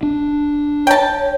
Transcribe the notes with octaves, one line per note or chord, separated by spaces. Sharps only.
D4
C#5 G5 A5